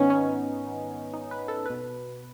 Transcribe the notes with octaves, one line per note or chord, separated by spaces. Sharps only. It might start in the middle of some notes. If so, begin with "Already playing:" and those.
Already playing: G#2 D#3 B3 C#4 D#4
C#4
D#4
B4
A4
B2 B4